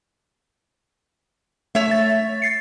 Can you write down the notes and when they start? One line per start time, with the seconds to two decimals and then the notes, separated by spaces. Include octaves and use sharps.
1.75 A3 C#5 E5
1.91 A6
2.42 A6 C7 C#7